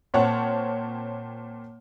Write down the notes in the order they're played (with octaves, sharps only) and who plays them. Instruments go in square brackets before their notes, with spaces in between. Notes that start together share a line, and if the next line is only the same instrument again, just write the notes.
[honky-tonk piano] A#2 C4 C#5 F#5 A5